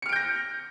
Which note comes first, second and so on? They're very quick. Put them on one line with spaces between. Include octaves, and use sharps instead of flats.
C#7 F6 D7 G6 A#6